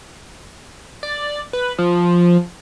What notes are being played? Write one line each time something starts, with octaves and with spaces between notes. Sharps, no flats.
D5
B4
F3